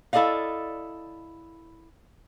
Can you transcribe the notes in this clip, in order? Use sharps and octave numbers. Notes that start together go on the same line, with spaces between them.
E4 A4 D5 D#5 F5